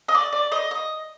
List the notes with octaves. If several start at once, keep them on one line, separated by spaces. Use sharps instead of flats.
D#5
D5
D5
D#5
D#5